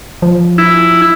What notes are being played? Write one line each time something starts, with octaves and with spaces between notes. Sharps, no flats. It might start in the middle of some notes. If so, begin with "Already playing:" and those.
F3
E4